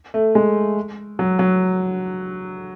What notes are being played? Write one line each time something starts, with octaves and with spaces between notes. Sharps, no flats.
A3
G#3
F#3
F#3